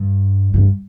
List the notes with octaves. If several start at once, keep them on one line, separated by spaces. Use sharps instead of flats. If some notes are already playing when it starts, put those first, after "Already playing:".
Already playing: G2
G2